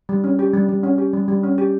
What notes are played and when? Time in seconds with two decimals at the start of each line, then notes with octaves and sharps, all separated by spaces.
0.09 G3
0.24 C#4
0.39 G4
0.54 G3
0.69 G3
0.83 C#4
0.98 G4
1.13 G3
1.28 G3
1.43 C#4
1.58 G4